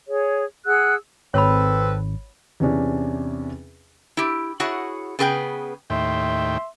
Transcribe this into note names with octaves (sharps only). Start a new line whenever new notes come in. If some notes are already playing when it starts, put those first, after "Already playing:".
G#4 C#5
G#4 F#5 E6 F#6
G#1 C4 A4 B4 C#5 B5
E2 C3 C#4 D4
E4 G4
E4 F#4 G#4 C#5 F#5
C#3 B3 G#4 B4 G5
D#2 A2 E5 G5 C6